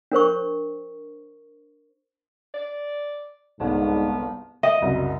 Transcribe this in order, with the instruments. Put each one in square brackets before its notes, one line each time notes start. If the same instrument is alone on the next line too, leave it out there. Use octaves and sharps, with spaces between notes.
[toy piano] D4 A#4 C5 C#6
[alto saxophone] D5
[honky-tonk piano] G1 C2 D5 [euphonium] G#2 [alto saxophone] B3
[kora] D#5 [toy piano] E5
[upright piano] F#1 C2 F#2